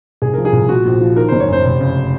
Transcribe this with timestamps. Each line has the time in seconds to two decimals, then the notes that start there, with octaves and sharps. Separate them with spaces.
0.22 C2 G#4
0.34 F3 A#4
0.45 G#4
0.53 C2
0.69 A#2 F#4
0.86 A#1
1.01 F3
1.16 D#3 A#4
1.28 F#1 C5
1.40 C#5
1.48 F#2 C5
1.65 F1
1.81 C#3